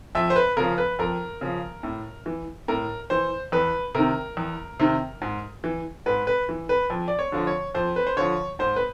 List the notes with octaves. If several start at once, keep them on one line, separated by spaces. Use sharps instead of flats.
F2 E5
C5
B4
C#3 F3 A#4
B4
F2 A#4
C#3 F3
A2
E3
A2 A#4
E3 C5
E2 B4
C3 D#3 A#4
E2
C3 D#3
G#2
E3
G#2 B4
B4
E3
B4
F2
D5
C#5
D3 F3
C#5
F2 C5
B4
C5
D3 F3 C#5
G#2 C5
B4